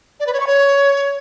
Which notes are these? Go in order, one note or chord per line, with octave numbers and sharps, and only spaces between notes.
D5
B4
C#5
C#6
C#5